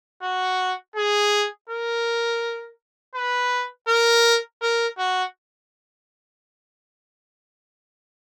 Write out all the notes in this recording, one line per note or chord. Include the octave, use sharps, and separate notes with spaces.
F#4
G#4
A#4
B4
A#4
A#4
F#4